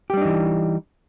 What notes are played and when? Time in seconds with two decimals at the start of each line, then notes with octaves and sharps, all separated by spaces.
0.10 G4
0.14 G3
0.17 D4
0.21 D#4
0.25 E3